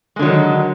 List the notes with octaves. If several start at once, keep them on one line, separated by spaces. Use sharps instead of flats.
D3 D#3 F#3 G#3